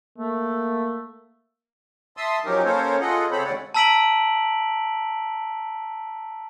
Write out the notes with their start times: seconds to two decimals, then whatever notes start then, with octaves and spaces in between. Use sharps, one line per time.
0.18 A3 A#3
2.17 E5 A5 C6 D#6 E6
2.45 F3 F#3 C#4 D#4 G4 A#4
2.65 A#3 C#4 A4 A#4 C5 C#5
3.01 F4 G#4 A4 D#5 F#5
3.31 C#3 C4 A4 C5 C#5 B5
3.45 D#2 D3 G#3 C#4 D5 F#5
3.74 A5 A#5 E6 B6 D7 F#7